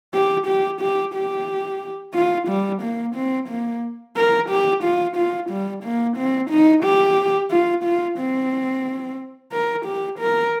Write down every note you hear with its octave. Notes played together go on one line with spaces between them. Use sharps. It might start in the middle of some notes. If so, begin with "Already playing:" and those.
G4
G4
G4
G4
F4
G3
A#3
C4
A#3
A#4
G4
F4
F4
G3
A#3
C4
D#4
G4
F4
F4
C4
A#4
G4
A#4